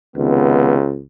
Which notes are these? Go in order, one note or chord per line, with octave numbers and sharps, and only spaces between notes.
C#2 C3 D#3 B3